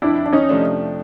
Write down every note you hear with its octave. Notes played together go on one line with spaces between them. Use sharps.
F2 D4 E4
D4
C#4 D#4
C3 F3 A3 D4